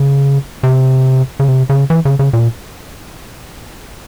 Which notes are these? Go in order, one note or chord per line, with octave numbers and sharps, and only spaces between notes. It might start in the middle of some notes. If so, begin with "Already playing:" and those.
Already playing: C#3
C3
C#3
C3
C#3
E3
C#3
C#3
A#2